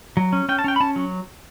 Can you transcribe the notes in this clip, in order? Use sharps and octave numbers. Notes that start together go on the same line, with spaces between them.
F#3
C#4
C#4 G5
A5
C#4 G5
B5
C#4 A5
F#3